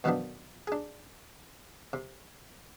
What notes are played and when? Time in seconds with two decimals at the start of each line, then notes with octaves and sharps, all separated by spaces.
0.04 F#2 B2 D#3 F3 B3 D4
0.67 D4 G#4
1.93 C3